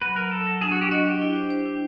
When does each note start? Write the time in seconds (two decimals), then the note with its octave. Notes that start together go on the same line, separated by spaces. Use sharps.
0.02 F#3 B4
0.16 F#3 A#4
0.31 F#3 A4
0.47 F#3
0.61 D4 G#4
0.71 F#4
0.77 D4 G4
0.91 F#4 D#5
1.05 D4 G4
1.22 E4
1.35 C5
1.50 C5
1.66 E4